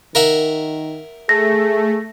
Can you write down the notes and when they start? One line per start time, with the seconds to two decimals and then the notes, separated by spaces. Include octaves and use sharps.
0.15 D#3 A#4 E5 F#5
1.29 A3 G#4 A#6